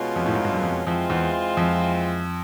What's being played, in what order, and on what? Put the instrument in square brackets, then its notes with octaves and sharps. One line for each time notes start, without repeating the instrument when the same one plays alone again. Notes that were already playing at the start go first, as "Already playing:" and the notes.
Already playing: [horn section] B2 G#3 C#4 F4
[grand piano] F2
A2
G#2
G2
F#2
F2
[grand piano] F2 [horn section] E3 G#3 C4 F4
[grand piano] E2
F2